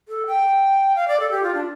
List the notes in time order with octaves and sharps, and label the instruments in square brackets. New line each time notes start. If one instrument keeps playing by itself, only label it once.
[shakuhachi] A4
G5
F5
D5
A4
G4
F4
D4